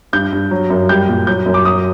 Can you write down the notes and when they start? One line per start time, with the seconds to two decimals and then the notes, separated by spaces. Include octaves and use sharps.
0.13 G2 G6
0.33 G2
0.51 F#3
0.70 F#2
0.89 G3 G6
1.08 A#2
1.27 F#3 G6
1.46 F#2
1.54 D6
1.65 F#3 D#6